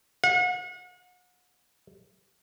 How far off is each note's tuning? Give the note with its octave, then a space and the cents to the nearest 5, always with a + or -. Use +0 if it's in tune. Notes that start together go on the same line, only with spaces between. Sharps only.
F#5 -40